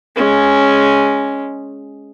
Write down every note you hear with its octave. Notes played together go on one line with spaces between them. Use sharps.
G#3 C#4